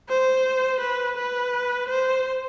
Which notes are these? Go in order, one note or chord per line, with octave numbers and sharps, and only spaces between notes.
C5
B4
B4
C5